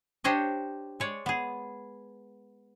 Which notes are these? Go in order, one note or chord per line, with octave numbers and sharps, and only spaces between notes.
D4 G4 C5 C#5 D#5
G#3 C#5 D5
B3 G#4